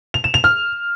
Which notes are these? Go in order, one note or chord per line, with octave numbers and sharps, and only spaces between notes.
F7
E7
F7
F6